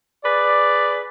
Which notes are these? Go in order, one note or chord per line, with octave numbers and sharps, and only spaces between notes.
G#4 B4 D5